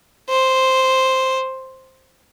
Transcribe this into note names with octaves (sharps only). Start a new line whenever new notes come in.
C5